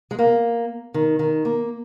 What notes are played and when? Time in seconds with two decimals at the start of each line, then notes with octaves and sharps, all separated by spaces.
0.11 G#3
0.19 A#3
0.94 D#3
1.19 D#3
1.45 A#3